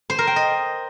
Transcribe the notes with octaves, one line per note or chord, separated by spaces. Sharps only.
C5
A#4
G5
D#5